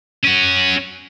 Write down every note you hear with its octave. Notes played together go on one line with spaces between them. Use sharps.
C#4 F#4